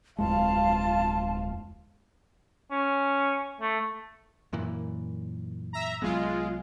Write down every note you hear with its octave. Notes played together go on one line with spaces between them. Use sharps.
D1 F2 G#3 F4 F5 A5
C#4
A3
F#2 A#2 E3
E5 A#5
C2 F#3 G#3 B3 F4